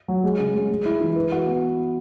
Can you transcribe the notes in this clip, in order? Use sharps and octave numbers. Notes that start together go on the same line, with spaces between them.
F#3
G#3
C#3
G#3
G#3
E4
E3
B4
F#4
B3